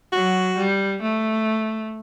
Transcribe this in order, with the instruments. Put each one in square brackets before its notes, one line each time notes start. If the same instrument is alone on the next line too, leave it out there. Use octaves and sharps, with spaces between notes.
[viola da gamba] F#3 [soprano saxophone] F#4
[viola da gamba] G3
A3